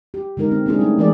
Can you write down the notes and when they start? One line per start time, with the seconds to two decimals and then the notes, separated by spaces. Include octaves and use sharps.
0.14 G4
0.37 D3 G#3 D#4 A#4
0.51 C4
0.66 G#3 A#3 C4 D4 E4 G#4
0.79 G3 A3 C#4 D#4
0.98 E3 G#3 G#4 A#4 D5